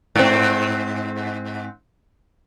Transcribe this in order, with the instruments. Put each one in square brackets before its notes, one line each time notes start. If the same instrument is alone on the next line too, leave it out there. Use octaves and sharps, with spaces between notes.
[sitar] G#2 C4